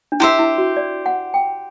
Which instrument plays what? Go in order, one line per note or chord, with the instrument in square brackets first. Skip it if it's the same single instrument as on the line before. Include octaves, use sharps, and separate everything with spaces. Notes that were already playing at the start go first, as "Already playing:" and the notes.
[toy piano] D4
[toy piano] E4 [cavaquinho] G4 C5 E5
[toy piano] E4
F#4
D5
F#5
G5